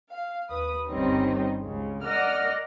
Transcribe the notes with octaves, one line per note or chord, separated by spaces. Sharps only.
F5
D#2 B4 D#6
G1 D#3 G3 C4 C#4 D#4
C#2 C#3
A#4 D5 D#5 F#5 F6 A#6